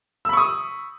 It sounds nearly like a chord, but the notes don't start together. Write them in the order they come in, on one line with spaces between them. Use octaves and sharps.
E6 B5 C#6 D#6